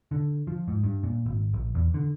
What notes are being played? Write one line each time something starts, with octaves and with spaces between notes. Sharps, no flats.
D3
F3
G#2
G2
A#2
G#1
A#1
E2
D3